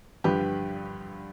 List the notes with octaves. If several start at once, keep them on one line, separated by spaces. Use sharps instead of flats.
G2 D3 F3 G4 B4